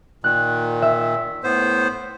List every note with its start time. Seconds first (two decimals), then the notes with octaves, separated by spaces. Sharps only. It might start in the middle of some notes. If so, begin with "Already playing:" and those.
0.24 A#2 D#3 F#6
0.82 E5
1.44 A2 B3 C5